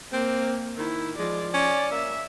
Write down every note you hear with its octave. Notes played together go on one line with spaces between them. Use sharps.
A#3 C4
D#3 E4
F3 G#3 D5
C#4 D5
A#3 E5